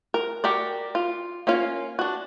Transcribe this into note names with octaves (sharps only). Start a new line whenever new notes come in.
A#4
F#4 G4 A#4 D5
F4
A#3 C#4 F4 F5
D4 F#4